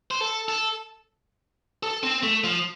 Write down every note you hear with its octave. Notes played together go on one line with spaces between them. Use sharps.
C5
A4
A4
A4
C4
A3
F3